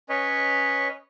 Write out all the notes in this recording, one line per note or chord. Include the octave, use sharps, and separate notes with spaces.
C#4 B4 C#5 D#5